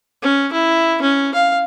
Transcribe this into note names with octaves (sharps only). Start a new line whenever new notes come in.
C#4
E4
C#4
F5